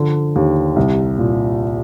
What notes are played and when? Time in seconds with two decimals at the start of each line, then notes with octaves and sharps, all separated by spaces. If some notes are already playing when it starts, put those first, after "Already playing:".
Already playing: D3 F3
0.36 D#2
0.76 C2
1.18 A#2